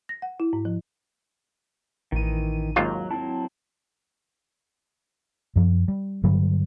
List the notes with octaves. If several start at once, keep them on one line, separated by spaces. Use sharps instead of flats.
A#6
F#5
E4
G#2
F3
A1 D#3 E3 D#7
G#1 D#2 F#3 F4 A#5 F#6
F#3 C4 E4 A5
F#2 F3
G3
G2 D3 F#3 G3